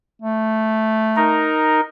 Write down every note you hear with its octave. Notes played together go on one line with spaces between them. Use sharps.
A3
D#4 A#4